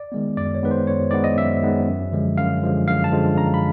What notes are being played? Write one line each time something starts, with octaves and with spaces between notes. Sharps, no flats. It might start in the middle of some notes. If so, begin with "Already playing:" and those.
Already playing: D5
D#3 G#3 B3
F#2 D5
C#5
D#3 G#3 B3 B4
C5
F#2 C#5
D#3 G#3 B3 D5
D#5
F#2 E5
D#3 G#3 B3
F#2
D3 F3 G#3
F#2 F5
D3 F3 G#3
F#2 F5
A5
D3 F3 G#3
F#2 A#5
B5